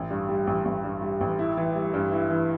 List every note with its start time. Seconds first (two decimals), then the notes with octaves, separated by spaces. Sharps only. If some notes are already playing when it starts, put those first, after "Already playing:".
Already playing: A1
0.11 G2
0.29 G3
0.47 A1
0.65 A1
0.84 G2
1.02 G3
1.21 A1
1.39 E4
1.57 E3
1.75 G3
1.94 G2
2.12 E4
2.30 E3